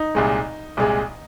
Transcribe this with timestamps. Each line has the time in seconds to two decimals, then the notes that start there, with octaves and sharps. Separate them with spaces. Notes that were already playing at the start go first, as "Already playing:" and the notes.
Already playing: D#4
0.15 C2 A#2 G#3
0.77 C2 A#2 G#3